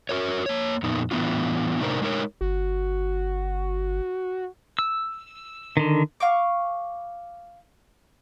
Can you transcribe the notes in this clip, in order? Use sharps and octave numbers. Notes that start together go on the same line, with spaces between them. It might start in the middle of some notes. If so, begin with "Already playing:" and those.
F#4 A#4 C#5
A#3 C#5
F2 A#2 B3 D#4
A2 E3 B3 D4 F4
A2 C3 D4 D#4 A#4 C5
G#3 D#4 A#4 C#5
G1 F#4
E6
D3 D#3
F5 C#6 D6